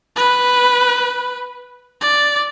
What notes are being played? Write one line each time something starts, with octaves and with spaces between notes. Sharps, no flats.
B4
D5